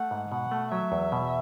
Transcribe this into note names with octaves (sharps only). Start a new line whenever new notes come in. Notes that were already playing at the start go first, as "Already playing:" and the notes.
Already playing: A3 F#5
G#2
B2 F#5
A3
F#3 E5
E2
B2